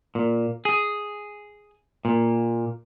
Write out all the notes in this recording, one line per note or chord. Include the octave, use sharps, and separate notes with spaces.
A#2
G#4
A#2